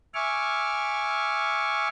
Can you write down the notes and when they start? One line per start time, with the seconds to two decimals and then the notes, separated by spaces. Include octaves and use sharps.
0.14 E5 G#5 C#6 D6 F6